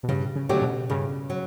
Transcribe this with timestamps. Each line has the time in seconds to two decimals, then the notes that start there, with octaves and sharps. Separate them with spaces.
0.03 B2
0.08 G2 C#3
0.36 C#3
0.49 F#3 A3 D4 G4
0.56 C#3
0.62 B2
0.90 G2 C#3
1.30 F#3